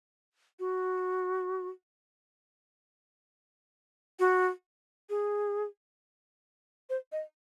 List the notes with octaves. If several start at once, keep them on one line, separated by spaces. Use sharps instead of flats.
F#4
F#4
G#4
C5
D#5